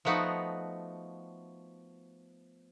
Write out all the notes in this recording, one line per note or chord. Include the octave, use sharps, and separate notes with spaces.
F3 A3 B3 D#4 F#4